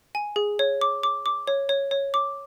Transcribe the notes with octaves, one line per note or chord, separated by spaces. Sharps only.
G#5
G#4
C#5
D6
D6
D6
C#5
C#5
C#5
D6